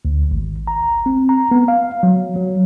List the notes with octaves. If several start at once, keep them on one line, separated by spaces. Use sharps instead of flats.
D2
G#1
A#5
C4
A#5
B3
F5
F#3
F#3